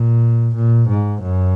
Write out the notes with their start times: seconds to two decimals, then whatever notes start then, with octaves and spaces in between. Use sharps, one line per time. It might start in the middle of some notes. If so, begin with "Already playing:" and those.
Already playing: A#2
0.55 A#2
0.89 G#2
1.22 F#2